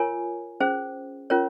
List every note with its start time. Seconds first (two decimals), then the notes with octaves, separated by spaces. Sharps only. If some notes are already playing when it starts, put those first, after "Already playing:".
Already playing: F4 A#4 C#5 G#5
0.60 C#4 G#4 C5
1.30 C#4 F4 A#4 C#5